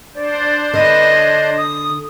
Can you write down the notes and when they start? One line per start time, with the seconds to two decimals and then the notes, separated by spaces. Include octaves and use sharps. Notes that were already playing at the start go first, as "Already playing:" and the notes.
0.15 D4 C5 D5
0.73 D3 B4 D#5
1.10 C#5
1.58 D#6